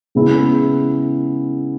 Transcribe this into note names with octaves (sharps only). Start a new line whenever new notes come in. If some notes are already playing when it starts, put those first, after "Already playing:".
C#3 G#3 B3 E4 G#4